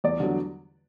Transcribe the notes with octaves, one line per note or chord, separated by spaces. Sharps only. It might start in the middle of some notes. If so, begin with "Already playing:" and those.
E2 D5
D3 F#3